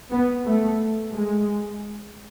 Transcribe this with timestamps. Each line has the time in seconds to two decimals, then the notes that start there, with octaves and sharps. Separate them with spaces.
0.11 B3
0.45 A3
1.12 G#3